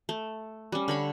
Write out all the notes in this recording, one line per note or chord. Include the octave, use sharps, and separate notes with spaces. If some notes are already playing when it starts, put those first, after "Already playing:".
A3
G3 C#4
D3 C#5 B5